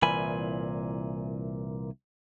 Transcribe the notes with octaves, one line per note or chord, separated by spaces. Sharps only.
C2 A#2 E3 G#5 B5